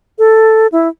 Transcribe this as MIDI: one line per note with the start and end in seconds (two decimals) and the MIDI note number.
0.19 0.67 69
0.72 0.88 64